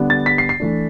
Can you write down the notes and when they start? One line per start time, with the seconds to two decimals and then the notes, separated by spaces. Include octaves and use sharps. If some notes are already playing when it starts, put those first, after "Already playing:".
Already playing: D3 G3 B3 D4
0.10 A6
0.26 B6
0.38 C7
0.49 C7
0.60 E3 A3 D4